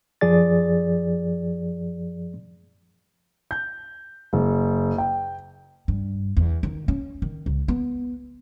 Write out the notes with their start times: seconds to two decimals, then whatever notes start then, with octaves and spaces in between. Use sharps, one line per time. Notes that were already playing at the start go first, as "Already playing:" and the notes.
0.21 F#2 F3 G#4 D5 A6
3.51 G6
4.33 F#1
4.98 G5
5.88 G2
6.37 E2
6.63 D#3
6.88 C#4
7.22 D#3
7.46 C#2
7.68 B3